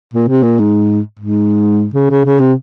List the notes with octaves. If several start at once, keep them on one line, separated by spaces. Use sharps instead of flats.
A#2
C3
A#2
G#2
G#2
C#3
C#3
C#3
C3